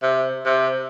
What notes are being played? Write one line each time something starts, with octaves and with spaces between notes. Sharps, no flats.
C3
C3